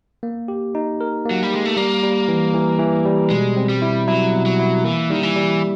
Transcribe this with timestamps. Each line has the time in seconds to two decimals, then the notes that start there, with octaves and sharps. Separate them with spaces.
0.23 A#3
0.48 G4
0.75 D#4
1.01 A#4
1.25 A#3
1.31 F#3
1.43 G3
1.52 G#3 G4
1.65 A3
1.77 G3 A#3
2.03 G3
2.28 E3
2.54 E3
2.79 E3
3.05 G3
3.30 B2 G#3
3.57 C4
3.69 G3
3.82 E4
4.08 F#3 E4
4.33 B2
4.46 F#3
4.59 E4
4.84 E3 A#3
5.10 D#3 G3
5.23 E3
5.36 G3